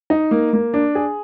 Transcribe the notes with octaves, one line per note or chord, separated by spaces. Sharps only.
D#4
A#3
A#3
D4
G#4